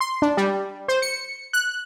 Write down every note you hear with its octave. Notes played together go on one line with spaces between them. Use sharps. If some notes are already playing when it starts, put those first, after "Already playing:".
C6
D4
G3
C5
C#7
F#6